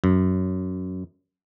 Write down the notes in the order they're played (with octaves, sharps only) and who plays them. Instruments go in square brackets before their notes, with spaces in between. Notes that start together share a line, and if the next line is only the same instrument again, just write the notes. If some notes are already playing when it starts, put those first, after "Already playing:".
[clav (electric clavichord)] F#2